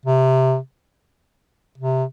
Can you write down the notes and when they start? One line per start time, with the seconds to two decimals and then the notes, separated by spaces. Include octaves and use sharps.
0.05 C3
1.78 C3